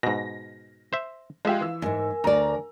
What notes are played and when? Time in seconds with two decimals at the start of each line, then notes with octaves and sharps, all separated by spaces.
0.03 G#2 B2 A#6
0.93 C5 E5
1.45 F3 G#3 F4 G4 E5 F5
1.61 E3 E6
1.82 E2 G#2 A#4 G#5
2.24 D2 D5 A#5